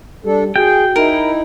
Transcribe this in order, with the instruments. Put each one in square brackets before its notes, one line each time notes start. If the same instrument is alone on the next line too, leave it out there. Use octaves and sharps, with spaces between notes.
[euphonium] G3 [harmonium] D4 A4
[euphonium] F#4 [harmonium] G#4 [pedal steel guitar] G5
[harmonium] D#4 E4 [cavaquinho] A#4